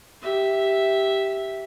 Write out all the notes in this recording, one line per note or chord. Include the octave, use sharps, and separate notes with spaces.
G4 E5